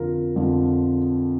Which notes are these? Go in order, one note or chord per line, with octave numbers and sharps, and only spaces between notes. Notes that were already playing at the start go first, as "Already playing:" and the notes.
Already playing: F2 D3 F3 F4 A#4
F2 D3 F3